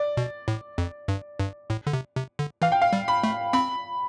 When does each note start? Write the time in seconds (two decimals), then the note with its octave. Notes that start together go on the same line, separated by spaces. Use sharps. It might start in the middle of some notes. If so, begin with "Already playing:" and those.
Already playing: D5
0.17 B2
0.48 A2
0.78 F2
1.08 G2
1.39 G2
1.70 A2
1.87 D3
1.93 C3
2.16 C3
2.39 D3
2.62 E3 F5
2.72 G5
2.82 F5
2.93 G3
3.08 B5
3.23 A3
3.53 C4 B5